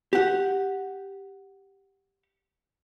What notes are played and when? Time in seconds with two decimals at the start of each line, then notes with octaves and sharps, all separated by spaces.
0.13 G4 F#5